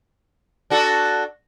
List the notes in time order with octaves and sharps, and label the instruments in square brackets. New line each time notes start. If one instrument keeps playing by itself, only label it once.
[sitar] D4 F#4 A4